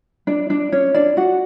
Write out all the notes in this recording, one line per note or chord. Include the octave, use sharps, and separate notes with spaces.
D4 D5
D4 D5
C#4 C#5
D4 D5
F#4 F#5